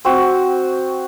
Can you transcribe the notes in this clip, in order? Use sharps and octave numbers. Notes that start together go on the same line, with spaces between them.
C4 F#4